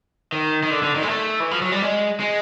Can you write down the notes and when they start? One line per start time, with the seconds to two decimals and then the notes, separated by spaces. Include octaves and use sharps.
0.32 D#3
0.63 D#3
0.70 D3
0.83 D3
0.95 D#3
1.03 G#3
1.08 A3
1.40 E3
1.51 F3
1.62 F#3
1.72 G3
1.82 G#3
2.20 G#3